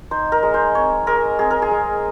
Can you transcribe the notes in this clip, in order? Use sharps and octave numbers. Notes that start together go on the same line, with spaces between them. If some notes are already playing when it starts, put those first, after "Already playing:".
D#4 C5
A#4
G#3
C5
C4 C#5
G#3 A#4
C4 G#4
A#4
G#4
G#3